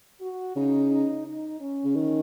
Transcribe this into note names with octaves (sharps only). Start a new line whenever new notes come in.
F#4
C#3 D#4
D#4
D#4
C#4
C#3
D#3